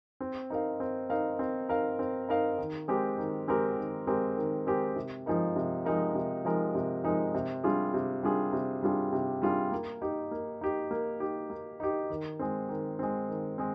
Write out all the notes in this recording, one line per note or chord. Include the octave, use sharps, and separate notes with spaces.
C4
D#4 A#4 F5
C4
D#4 A#4 F5
C4
D#4 A#4 F5
C4
D#4 A#4 F5
D#3
G#3 C4 G4 A#4
D#3
G#3 C4 G4 A#4
D#3
G#3 C4 G4 A#4
D#3
G#3 C4 G4 A#4
C3
F3 G#3 D#4 A#4
C3
F3 G#3 D#4 A#4
C3
F3 G#3 D#4 A#4
C3
F3 G#3 D#4 A#4
C3
G3 D4 F4 G#4
C3
G3 D4 F4 G#4
C3
G3 D4 F4 G#4
C3
G3 D4 F4 G#4
A#3
D#4 G4
A#3
D#4 G4
A#3
D#4 G4
A#3
D#4 G4
D#3
G#3 C4
D#3
G#3 C4
D#3
G#3 C4